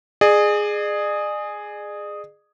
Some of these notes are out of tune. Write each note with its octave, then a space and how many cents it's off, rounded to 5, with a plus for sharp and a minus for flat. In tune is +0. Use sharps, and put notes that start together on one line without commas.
G#4 +0 D5 +45